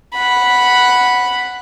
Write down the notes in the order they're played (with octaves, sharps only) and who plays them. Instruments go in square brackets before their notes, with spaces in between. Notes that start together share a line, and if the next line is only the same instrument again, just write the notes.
[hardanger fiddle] F#5 B5